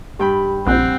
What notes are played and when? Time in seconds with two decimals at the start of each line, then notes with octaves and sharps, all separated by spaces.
0.19 G2 G4 G5 B5
0.67 A#1 C4 F#5 F#6 G6